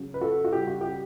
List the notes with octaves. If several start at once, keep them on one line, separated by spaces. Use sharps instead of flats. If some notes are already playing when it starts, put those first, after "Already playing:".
Already playing: C#3 F#3
B4
F#4 A4
F#4
C#3 G3 G4
F#4
G4